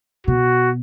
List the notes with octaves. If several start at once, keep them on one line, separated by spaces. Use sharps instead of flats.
B2 F#4